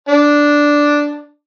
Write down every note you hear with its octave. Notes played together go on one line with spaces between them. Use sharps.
D4